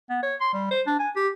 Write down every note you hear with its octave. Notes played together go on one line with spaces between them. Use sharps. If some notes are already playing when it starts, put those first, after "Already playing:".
B3
C#5
C6
G3
C5
D4
G#5
G4